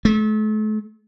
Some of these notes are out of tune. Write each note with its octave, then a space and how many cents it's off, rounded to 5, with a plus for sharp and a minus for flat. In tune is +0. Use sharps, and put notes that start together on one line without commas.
A3 -40